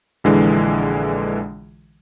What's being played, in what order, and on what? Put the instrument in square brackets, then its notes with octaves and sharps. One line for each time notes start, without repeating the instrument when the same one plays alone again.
[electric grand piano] A#1 D3 E3 G#3